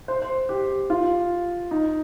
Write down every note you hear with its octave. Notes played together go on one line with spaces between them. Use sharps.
C5
C5
G4
F4
D#4